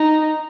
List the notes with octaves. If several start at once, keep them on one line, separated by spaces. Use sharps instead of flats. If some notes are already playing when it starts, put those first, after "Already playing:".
Already playing: D#4